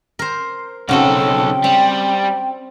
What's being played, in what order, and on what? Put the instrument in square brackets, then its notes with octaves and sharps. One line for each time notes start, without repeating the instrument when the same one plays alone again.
[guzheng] A#4 C5
[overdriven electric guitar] B1 A4 [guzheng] C#3 C4 F#4 [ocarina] F#5
[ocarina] G5
[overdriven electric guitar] G3 [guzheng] C4